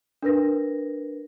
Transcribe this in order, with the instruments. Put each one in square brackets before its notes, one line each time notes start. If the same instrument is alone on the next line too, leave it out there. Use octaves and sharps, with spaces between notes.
[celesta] D4 A#4 B4 A#6